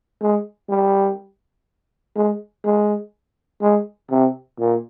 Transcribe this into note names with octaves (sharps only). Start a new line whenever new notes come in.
G#3
G3
G#3
G#3
G#3
C3
A#2